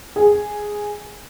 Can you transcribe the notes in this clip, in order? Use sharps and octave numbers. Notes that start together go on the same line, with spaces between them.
G#4